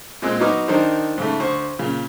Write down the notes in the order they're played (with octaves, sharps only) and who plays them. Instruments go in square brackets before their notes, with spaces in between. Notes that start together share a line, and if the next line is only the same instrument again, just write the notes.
[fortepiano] A#2 G#3 C4 E6 F#6
F#3 B3 D#4 F#4 D6 F6
D#3 D4 D#4 A#4 C5
G#2 C#3 A3
D2 C5 C#6
A#2 C#3